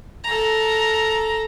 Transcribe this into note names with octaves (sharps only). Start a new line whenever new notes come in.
A4 A#5